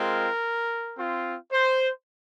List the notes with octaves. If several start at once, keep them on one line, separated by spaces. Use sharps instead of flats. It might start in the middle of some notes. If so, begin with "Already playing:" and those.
Already playing: G#3 C4 F4 A#4
C4 F4
C5